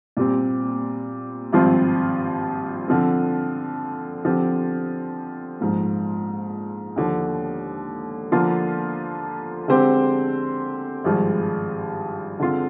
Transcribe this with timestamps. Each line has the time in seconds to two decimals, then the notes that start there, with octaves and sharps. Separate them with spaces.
0.17 A#2 G3 C4
1.52 G#1 G2 F3 C4 F4
2.88 D3 F3 C4
4.25 D3 F3 C4 G4
5.60 A#1 G#2 F3
6.96 D#2 D3 F3
8.32 D3 F3 A#3 F4
9.68 D3 G#3 C4 G4 C5
11.04 G#1 G2 F3 G#3
12.40 D3 G#3 C4 F4